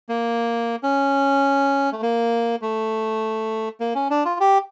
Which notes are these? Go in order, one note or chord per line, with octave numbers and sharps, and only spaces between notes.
A#3
C#4
A3
A#3
A3
A#3
C#4
D4
F4
G4